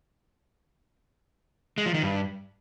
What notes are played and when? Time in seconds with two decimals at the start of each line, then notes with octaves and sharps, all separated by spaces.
1.78 G#3
1.86 F3
1.94 D#3
2.02 G2